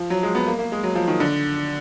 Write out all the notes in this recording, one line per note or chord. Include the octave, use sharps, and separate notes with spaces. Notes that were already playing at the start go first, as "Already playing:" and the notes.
Already playing: F3
F#3
G#3
B3
A#3
A#3
G#3
F#3
F3
D#3
D3